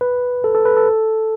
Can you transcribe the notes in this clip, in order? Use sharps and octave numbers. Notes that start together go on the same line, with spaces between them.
B4
A4
A4
B4
A4